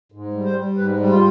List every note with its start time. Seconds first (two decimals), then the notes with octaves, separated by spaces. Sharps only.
0.12 G#2
0.34 G3
0.45 C5
0.56 G3
0.77 G#2 B4
0.99 G3
1.10 F4